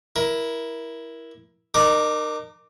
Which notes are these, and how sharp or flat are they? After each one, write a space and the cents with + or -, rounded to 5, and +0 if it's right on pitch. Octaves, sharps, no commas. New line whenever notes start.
E4 +0 A#4 +20
D#4 -40 A#4 +0 D6 +0